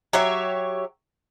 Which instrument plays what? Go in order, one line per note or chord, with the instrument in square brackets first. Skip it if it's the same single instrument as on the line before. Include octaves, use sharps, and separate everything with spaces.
[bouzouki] F#3 G4 C#5 E5